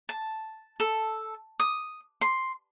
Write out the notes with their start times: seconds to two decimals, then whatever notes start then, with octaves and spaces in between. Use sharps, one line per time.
0.09 A5
0.80 A4
1.60 D#6
2.21 C6